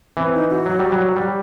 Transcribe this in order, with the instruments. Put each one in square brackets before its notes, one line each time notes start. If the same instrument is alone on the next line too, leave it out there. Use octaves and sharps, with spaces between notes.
[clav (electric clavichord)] E3 [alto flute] C4
[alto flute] D#4
F#4
[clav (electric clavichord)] F#3
G3
F#3
[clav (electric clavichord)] G3 [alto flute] G4